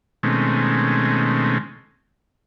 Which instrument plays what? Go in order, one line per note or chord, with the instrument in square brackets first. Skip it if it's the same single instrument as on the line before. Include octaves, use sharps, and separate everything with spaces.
[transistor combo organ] B2 D#3 G#3 A3 C4 C#4